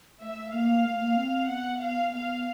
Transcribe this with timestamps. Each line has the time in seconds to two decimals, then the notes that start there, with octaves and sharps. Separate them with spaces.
0.21 A3 E5
0.53 A#3 F5
0.85 A3
1.01 A#3
1.17 C4
1.49 B3 F#5
1.81 F5
2.12 B3 F5